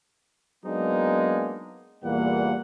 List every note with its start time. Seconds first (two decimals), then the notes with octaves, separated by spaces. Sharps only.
0.65 F#3 G#3 A#3 B3 D4 D#4
2.03 E2 A#2 E3 G3 A#3 F#5